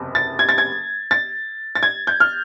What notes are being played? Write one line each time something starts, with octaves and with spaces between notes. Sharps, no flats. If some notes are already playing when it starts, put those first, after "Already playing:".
Already playing: F#1 E2 C3
A6
G#6
A6
G#6
A6
A6
G#6
G6
F6